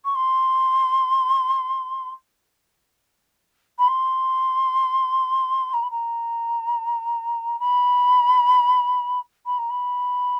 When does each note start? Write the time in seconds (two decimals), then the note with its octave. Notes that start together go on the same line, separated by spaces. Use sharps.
0.05 C#6
0.15 C6
3.78 B5
3.88 C6
5.73 A#5
5.82 B5
5.90 A#5
7.59 B5
9.46 B5
9.58 A#5
9.70 B5